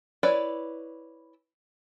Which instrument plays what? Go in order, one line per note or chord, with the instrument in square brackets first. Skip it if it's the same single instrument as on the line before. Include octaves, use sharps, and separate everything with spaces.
[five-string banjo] E4 B4 C#5 D5